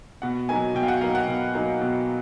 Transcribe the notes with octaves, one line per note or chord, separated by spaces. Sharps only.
B2 F#5
F#3 A#3 D#4 G#5
B2 G5
F5
F#5
F#3 A#3 D#4 F5
F#5
B2
F#3 A#3 D#4
B2